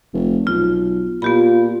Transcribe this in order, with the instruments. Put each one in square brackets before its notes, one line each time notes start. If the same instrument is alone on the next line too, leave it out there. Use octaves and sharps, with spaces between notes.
[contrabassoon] F1
[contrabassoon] B1 [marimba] F4
[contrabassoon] A#2 [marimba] B3 G4 B5 [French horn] F4